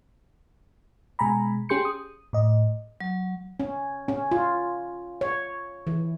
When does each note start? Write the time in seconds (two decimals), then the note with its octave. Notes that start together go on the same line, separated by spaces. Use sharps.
1.19 B2 G#3 G#5 A#5 B5
1.69 C#4 G4 G#4 C6 G6 C#7
1.85 D#6
2.33 A2 D#5
3.00 F#3
3.60 C#4
4.08 C#4
4.31 F4
5.21 C#5
5.87 E3